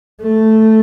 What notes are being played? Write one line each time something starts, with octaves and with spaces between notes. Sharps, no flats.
A3